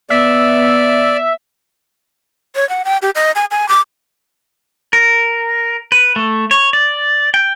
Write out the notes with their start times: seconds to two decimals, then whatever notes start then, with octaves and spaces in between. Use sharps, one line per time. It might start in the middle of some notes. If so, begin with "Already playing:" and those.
0.10 B3 D5 E5
2.56 C#5
2.69 F#5
2.85 G5
3.02 G4
3.15 D#5
3.36 G#5
3.51 G#5
3.69 D6
4.93 A#4
5.92 B4
6.16 A3
6.51 C#5
6.73 D5
7.34 G5